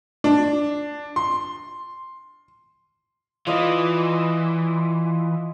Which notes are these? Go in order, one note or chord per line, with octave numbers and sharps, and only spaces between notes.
D4
C6
E3 F4 D5 D#5